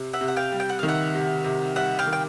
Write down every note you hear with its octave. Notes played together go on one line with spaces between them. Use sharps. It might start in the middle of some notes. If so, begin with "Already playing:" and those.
Already playing: C3
E5 F#5
C3
F#5
F5 G5
G3
G5
F#5
D#3 F5
E5 F#5
C3
C3
G3 E5 F#5
F5 G5
D#3
G5